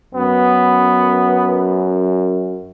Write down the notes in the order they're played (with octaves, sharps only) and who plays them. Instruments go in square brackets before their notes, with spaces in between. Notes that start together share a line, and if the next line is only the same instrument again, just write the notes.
[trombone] F#2 [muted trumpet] B3